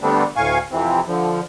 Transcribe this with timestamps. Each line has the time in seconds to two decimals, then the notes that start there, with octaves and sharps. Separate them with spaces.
0.01 D3 G3 A3 B3 C4 D4
0.36 D2 A2 F5 G#5 C#6
0.72 F2 C3 E3 C4
1.07 D3 F3